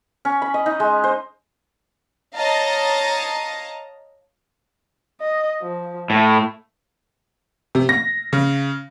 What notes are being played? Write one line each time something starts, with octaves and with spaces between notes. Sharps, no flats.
C#4
B5
D#5
D#4
G#3
C5
C#5 D#5 F5 A5 A#5
D#5
F3
A2 A3
C3
A#6
C#3